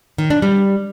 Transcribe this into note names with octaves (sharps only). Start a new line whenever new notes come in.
D#3
D4
G3